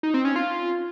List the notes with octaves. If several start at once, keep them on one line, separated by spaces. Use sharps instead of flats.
D#4
C4
C#4
F4